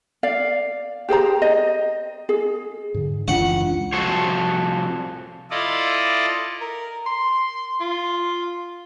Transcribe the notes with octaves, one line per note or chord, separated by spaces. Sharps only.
D5 F5
G4 G#4 C5 A#5
D#5
G#4
G#2 D3
F#1 C#2 E3 D4 F4 F#5 G5 C#6
C2 F3 F#4 A4 C5 C#5
E4 F4 A4 D5 D#5
A#4
C6
F4